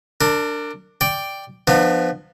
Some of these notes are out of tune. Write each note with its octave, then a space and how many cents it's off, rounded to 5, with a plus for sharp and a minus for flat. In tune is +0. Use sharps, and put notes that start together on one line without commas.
D4 +5 A#4 -30
D5 +0 G5 +0
F3 +0 B3 +0 D4 +45